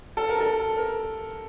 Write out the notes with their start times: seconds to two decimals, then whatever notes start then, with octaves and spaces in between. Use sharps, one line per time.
0.17 A4
0.29 A#4
0.40 A4
0.77 A#4